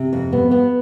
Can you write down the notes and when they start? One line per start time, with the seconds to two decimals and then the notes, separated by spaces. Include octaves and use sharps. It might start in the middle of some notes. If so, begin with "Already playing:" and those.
Already playing: C3
0.13 F2
0.32 B3
0.51 B3